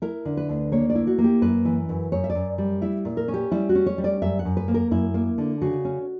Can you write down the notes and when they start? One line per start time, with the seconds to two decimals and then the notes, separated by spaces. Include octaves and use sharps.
0.02 E4 A#4
0.25 D3
0.37 B4
0.49 D2
0.72 A#3 C#5
0.90 D5
0.95 E4
1.07 F#4
1.18 A#3
1.24 G4
1.42 F#2 B4
1.65 E3
1.89 F#2
2.12 F#2 C#5
2.24 E5
2.30 D5
2.35 F#2
2.58 G3
2.82 E4 E5
3.05 A#2
3.17 A#4
3.28 C#4
3.34 G4
3.52 G3 E4
3.69 F#4
3.75 C#4
3.86 C#5
3.98 G3
4.04 D5
4.22 F#2 E5
4.39 F#5
4.45 F#2
4.57 B4
4.68 A#3
4.74 A#4
4.91 F#2 E4
5.14 A#3
5.38 D3
5.61 C#3 F#4
5.85 C#4